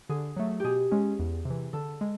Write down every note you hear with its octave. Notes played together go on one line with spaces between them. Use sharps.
D3 G#4
F#3 A3
B2 G4 G#4
G#3 C#4
E2
C3 E3
D3 A4
G#3